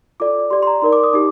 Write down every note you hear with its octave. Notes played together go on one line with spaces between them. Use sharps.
F4 A4 D5 D6
G4 D5 C6
C6
A#5
D#4 A#4 D5 C6
D6
D#6
D#4 G4 D6